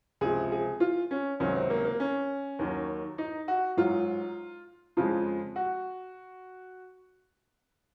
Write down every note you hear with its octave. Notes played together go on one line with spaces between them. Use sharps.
C#2 C3 F3 G#4
G#4
F4
C#4
C#2 C3 D#3 F#3 C#4
C4
A#3
A#3
C#4
D#2 D#3 F#3
D#4
F#4
G#2 F#3 F4
F2 C#3 G#3 F4
F#4